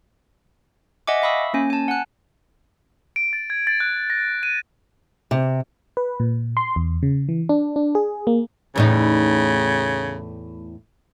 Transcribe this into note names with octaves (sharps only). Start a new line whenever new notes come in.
D#5 E5 F#5 G#5 D6
E5 F5 B5 C#6 D#6 E6
A#3 C#4 G#5
G#5 A5
F#5 G#5 F#6
D7
A6
G#6
A6
F#6
A#6
D#7
C3
B4
A#2
C6
E2
C#3
E3
D4
D4
G#4
A#3
E2 A2 C#3 D#4